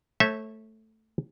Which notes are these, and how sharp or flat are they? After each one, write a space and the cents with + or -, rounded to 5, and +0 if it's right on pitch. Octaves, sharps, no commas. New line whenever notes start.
A3 +0 C#5 -35 E5 -15